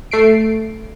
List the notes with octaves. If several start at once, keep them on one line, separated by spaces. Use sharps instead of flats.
A3 C7 D7